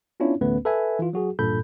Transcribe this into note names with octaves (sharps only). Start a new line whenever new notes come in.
B3 C#4 D4 E4 F4 C#5
A1 D2 A3 B3 C#4 B4
A4 B4 E5 G#5
E3 F4
F#3 F#4 G#4
A1 G2 A#2 A4 B5 G6